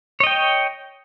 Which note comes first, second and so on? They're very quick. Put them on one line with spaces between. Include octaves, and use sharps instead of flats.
C#5 D#5 G5